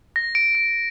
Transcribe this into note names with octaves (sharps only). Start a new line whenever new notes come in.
A#6
D7
D7